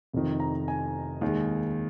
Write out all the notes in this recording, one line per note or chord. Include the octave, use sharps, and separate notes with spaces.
F1 F2 D#3
A#5
G#5
D#2 D#3 G#3